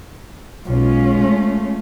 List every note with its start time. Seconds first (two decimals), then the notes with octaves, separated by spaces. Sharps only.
0.66 B1 G#3 C#4 F4
1.22 A3